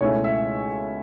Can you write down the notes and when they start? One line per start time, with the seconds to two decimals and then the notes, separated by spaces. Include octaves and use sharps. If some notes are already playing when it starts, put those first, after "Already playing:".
0.01 C#2 B2 A3 C#4 E4 C#5
0.24 E5